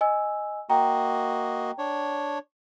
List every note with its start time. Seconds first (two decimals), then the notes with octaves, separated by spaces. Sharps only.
0.01 D#5 G#5 E6
0.70 A#3 F#4 D#5 G5 A#5
1.78 D4 C#5